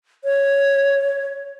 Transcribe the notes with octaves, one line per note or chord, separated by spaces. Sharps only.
C#5